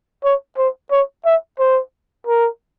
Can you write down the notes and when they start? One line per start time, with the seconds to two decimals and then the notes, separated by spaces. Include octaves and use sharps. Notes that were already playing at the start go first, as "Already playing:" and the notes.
0.24 C#5
0.58 C5
0.91 C#5
1.25 E5
1.59 C5
2.27 A#4